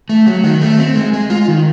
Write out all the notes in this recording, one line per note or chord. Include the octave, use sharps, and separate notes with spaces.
A3
F#3
D#3
A3
C4
G#3
G#3
F4
D#3